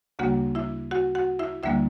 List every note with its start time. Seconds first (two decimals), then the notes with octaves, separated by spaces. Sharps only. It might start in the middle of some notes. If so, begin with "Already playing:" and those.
0.19 D2 C#3 G3 A#3 F#4 F#5
0.55 E4 E5
0.91 F#4 F#5
1.15 F#4 F#5
1.39 E4 E5
1.63 D2 D3 G3 A#3 E4 E5